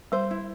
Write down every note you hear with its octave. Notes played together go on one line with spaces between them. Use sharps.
G3 C5
E4